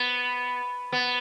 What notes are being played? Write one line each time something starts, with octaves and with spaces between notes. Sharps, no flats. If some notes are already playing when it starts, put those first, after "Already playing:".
Already playing: B3
B3